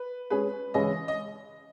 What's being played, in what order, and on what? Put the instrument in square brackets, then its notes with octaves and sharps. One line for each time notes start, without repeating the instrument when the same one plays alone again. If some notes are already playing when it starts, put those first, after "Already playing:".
Already playing: [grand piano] B4
[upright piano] G#3 C#4 G#4 [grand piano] B4
[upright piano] C#3 E3 G#3 C#4 E4 [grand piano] D#5
[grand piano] D#5